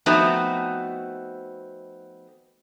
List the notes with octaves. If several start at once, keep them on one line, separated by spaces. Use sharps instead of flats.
F3 A3 B3 C4 D#4 F#4